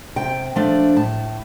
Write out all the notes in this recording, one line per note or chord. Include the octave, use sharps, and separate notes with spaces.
C3 G5
F3 A3 D4
A2 A5